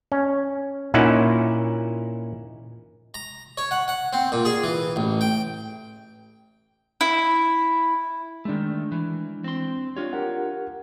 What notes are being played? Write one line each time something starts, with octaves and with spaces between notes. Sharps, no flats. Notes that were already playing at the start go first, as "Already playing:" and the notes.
C#4
A#2 C#4 D#4 E4 E5 F#5
A#5
C#5
F#5
F#5
C4
A#2
G#4
E3
A1
G5
E4
D#3 G#3 A3 D4
E3
C4 C6
D4 F4 G4 C#5
G4 A#4 F#5